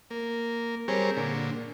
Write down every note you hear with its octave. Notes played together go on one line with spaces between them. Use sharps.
A#3
G3 C4 G#4 A#4 C#5
A#2 D3